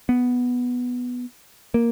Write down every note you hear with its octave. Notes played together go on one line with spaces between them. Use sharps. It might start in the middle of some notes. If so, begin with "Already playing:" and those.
B3
A#3